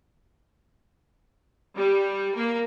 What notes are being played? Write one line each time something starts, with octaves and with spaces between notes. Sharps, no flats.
G3
A#3